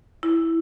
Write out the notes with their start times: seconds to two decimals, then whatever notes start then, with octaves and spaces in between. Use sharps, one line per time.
0.23 E4